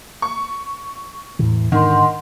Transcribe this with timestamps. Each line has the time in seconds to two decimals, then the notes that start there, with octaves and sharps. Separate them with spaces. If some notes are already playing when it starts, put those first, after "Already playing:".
0.22 C#6
1.39 E2 A2 E3
1.72 G#2 D3 D#3 F#5 C6